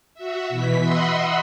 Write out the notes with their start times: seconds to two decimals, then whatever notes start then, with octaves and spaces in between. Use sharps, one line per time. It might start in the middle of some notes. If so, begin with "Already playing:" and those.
0.14 F#4 E5
0.49 B2 E3 B6
0.80 D#5 E5 F#5 B5 C6 E6